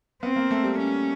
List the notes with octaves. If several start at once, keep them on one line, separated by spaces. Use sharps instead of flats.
B3 C4
A#3
A3
G3
G3 C#4